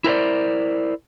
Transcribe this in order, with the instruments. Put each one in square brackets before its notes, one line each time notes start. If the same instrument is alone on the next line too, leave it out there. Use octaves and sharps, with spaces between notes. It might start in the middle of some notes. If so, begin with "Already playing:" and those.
[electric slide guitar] E4 A#4 C5 D5